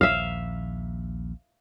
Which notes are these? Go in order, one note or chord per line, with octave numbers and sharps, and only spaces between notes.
A#1 D#2 E5 F5